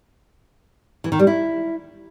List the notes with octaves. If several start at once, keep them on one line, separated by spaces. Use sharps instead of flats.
E3
D#3
G3
E4